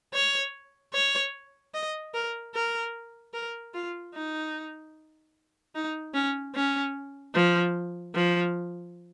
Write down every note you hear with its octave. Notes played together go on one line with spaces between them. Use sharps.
C#5
C#5
D#5
A#4
A#4
A#4
F4
D#4
D#4
C#4
C#4
F3
F3